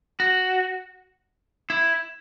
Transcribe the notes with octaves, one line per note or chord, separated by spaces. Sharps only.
F#4
E4